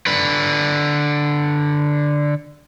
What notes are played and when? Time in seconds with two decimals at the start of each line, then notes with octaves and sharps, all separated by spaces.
0.07 D3 B4